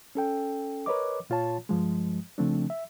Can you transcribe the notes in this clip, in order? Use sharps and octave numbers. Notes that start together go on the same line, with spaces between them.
C#4 A4 G5
A#4 B4 C#5 D#5 D6
A#2 F4 C#5 A5
G2 F3 G#3
C#3 F3 A3 C4 D4
E5